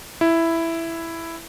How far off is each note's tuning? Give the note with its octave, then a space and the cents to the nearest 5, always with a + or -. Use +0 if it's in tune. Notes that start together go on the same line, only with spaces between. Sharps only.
E4 +5